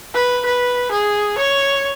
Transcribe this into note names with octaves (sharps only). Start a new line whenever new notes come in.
B4
B4
G#4
C#5